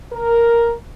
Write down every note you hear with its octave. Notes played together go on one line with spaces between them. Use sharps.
A#4